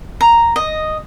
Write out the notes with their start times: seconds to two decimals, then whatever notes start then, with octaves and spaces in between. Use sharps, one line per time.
0.21 A#5
0.56 D#5